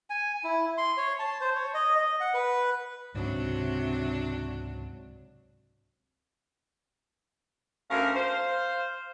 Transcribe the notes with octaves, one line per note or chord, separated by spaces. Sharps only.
G#5
E4
C6
C#5
A5
C5
C#5
D#5
D#5
F#5
B4
C#2 G#2 C3 F#3 D4
D2 C#4 A#4 F5
C5